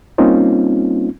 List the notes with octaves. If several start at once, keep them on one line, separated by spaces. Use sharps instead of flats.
G3 A#3 C4 C#4 D#4 F4